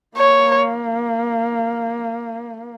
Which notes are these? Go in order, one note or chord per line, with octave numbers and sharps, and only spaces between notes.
A#3 C#5